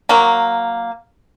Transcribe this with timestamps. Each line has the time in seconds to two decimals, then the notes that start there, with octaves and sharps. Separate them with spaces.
0.09 F#3 A#3